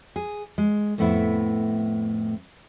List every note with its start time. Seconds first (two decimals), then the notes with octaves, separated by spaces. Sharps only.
0.16 G#4
0.58 G#3
0.98 F2 A2 A3 B3 E4